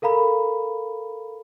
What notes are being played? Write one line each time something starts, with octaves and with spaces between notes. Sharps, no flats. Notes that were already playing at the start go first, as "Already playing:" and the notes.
A4 A#4 F5 A#5 B5